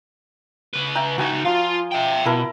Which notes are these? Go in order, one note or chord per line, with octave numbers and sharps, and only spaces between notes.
C#3 B4
E5 G5 A#5
C#2 D#4 F#4 G#5 C#6
F3 F4
E5 G5
B2 E4 A#4 A5